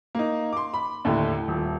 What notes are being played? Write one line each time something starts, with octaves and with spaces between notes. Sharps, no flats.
A#3 D#4
C6 D6
B5
D#2 A2 D3
D#1